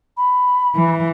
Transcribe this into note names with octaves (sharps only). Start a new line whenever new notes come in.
B5
E3